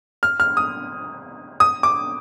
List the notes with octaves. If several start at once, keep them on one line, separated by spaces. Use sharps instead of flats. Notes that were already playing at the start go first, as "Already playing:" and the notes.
F6
F6
D#6
D#6
D6